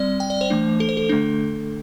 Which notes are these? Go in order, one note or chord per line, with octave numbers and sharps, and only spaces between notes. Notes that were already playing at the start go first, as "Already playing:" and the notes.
Already playing: G3 C4 D5
G5
D5
C5
E3 A3 D4
A4
C5
A4
D3 A3 D4